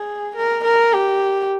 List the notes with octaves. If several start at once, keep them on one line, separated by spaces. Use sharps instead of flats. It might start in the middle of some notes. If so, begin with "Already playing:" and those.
Already playing: G#4
A#4
A#4
G4